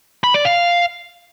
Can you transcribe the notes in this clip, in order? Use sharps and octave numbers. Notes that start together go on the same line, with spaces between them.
B5
D5
F5